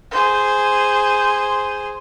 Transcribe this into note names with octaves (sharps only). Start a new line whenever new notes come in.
G#4 C5